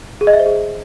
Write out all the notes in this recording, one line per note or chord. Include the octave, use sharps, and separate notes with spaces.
G#4
D#5
E5
C5
G#4